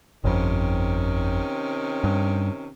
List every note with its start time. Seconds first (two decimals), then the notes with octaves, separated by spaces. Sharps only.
0.24 G1 F2 C3 D#3 C#4
2.04 G2